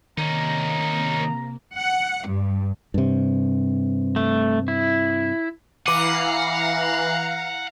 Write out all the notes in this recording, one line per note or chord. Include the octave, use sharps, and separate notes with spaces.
C3 D#3 A#3 C#4 D#4 A#5
F#5
G2
G2 C3
A3
E4
E3 F5 F#5 A#5 D6 C7 D#7